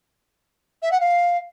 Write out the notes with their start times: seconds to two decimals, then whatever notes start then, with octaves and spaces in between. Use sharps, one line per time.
0.82 E5
0.91 F#5
1.00 F5